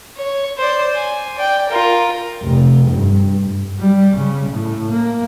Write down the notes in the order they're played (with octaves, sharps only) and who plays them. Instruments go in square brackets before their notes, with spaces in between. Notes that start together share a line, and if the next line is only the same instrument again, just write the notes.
[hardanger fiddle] C#5
C5 D5
G#5
D5 G5
F4 A#4
[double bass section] F1
G2
[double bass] G3
C#3
A2
A#3